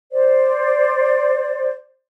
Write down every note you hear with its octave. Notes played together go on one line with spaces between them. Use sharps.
C5 D5